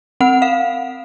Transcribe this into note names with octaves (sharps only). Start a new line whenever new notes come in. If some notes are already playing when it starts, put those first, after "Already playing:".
C4 F#5
F5